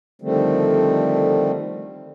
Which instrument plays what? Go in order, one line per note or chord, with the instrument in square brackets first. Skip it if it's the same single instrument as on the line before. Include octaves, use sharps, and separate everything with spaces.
[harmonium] D3 D#3 F3 G3 A3 C4